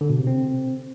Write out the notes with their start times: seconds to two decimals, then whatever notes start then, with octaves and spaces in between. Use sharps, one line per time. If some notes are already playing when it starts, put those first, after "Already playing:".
0.01 D3
0.10 B2
0.18 C3
0.27 C4